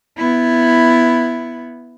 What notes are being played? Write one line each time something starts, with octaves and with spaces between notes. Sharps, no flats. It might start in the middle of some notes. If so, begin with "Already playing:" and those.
B3 E4